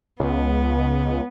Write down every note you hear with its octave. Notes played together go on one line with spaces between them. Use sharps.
C#2 B3